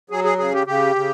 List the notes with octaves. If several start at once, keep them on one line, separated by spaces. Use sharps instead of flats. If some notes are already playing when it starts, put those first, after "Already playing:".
F#3 G#4
G#4
C#3 G#4
G4
C#3 G4
C#3